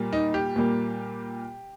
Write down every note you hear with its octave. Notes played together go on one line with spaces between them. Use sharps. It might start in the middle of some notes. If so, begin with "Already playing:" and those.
Already playing: A#2 G3 A#3
D#4
G4
A#2 G3 A#3